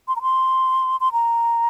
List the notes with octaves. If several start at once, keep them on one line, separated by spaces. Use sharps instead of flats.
C6
A#5
C6
C6
A#5